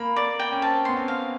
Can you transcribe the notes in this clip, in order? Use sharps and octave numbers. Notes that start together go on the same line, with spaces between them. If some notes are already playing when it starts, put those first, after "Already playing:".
Already playing: A#3 B5
D5
G5
C#4
C4 A5
B3 C6
C4
F5